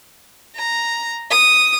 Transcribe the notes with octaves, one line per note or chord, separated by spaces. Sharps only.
A#5
D#6